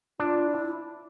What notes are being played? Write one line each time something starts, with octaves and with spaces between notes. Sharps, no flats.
D4 F4
E4